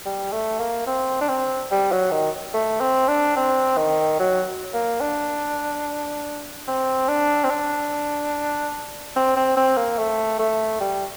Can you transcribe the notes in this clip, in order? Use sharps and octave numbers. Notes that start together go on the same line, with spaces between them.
G3
A3
A#3
C4
D4
C4
G3
F#3
D#3
A3
C4
D4
C4
D#3
F#3
A#3
D4
C4
D4
C4
D4
C4
C4
C4
A#3
A3
A3
G3